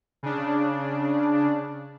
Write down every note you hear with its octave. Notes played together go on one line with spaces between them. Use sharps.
C#3 D4